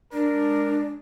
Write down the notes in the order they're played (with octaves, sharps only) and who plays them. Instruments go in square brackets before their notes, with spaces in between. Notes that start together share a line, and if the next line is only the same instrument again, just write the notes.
[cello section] G#3 [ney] D4 [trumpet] A#4 [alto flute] D5